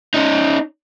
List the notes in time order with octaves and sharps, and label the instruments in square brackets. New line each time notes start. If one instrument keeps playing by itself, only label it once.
[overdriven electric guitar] C#4 D#4